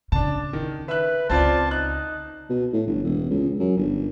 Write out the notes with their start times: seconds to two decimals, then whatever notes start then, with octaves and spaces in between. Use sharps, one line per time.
0.12 C#3 D4 A5
0.53 D#3
0.89 B4 E5 F#6
1.30 C#2 C4 F4 D5 A5
1.71 D#4 F#6
2.49 B2
2.73 A2
2.87 G1
3.04 E1
3.30 C#2
3.59 F#2
3.77 G1